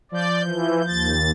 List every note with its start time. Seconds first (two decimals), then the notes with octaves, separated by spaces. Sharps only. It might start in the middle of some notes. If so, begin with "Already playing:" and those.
0.12 F3 D5 G6
0.43 E3
0.88 D#2 A6